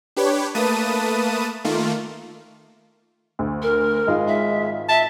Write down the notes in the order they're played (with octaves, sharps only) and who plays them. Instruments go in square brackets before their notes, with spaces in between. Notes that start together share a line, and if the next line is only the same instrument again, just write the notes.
[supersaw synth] D4 G4 B4 C#5
A3 A#3 B4 A5 D#6 D#7
D#3 A3 A#3 F4
[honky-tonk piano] D2
[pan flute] A#4
[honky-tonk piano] G#1 F4 [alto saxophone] G#3
[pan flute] E5
[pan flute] E5 [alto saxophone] A5